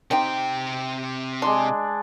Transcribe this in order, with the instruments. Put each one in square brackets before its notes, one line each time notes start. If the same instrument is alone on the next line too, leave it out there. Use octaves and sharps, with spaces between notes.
[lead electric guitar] C3 G5 [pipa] C4 D#4 G4
[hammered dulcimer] G#3 D4 [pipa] C6